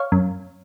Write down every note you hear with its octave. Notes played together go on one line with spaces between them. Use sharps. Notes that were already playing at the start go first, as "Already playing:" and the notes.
Already playing: C#5 F5
F#2